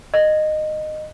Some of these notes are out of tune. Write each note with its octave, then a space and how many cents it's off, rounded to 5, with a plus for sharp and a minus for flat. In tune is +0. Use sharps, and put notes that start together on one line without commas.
D#5 -15